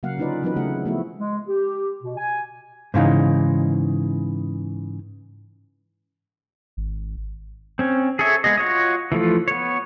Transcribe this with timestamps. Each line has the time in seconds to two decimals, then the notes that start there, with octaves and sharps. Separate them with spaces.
0.03 C#3 F#3 A#3 F5 F#5
0.18 D3 C#4 D#4 F4 B4 D5
0.43 E3 F#3 C4 D#4 A#4 B4
0.56 C#3 A3 G#4 F#5
0.85 F3 A3 B3 E4 F#4
1.18 G#3
1.49 G4
2.03 B2
2.17 G#5
2.94 G#2 C#3 E3 D#4
6.77 G#1
7.79 C4 C#4
8.19 G#4 A4 C#5 E5
8.44 G#3 B3 G#4 D#5
8.58 F4 F#4 C#5 D#5
9.12 E3 F3 A3 F4
9.48 B3 C#5